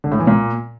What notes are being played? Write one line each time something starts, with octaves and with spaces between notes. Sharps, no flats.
D3
A2
E3
A#2